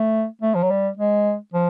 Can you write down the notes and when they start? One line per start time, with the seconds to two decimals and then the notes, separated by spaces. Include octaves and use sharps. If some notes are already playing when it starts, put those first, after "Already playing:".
Already playing: A3
0.41 A3
0.55 F3
0.63 F#3
0.70 G3
0.97 G#3
1.54 F3